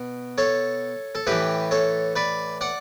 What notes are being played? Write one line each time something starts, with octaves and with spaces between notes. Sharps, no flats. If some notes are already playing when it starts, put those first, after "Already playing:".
Already playing: B2
A4 C#5
A4
A2 E3 G4 B4
A4 C#5
B4 D5
D5 F#5